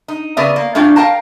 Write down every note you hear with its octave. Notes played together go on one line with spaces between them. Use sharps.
D#4
C#3 B3 A#4 D5 E5
A#3
A2 C#4 D4 F4 G5
A#4 F5 G5 A5